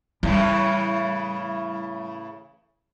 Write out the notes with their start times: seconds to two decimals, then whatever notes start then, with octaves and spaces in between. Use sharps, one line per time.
0.23 A2 C#3 E3 G3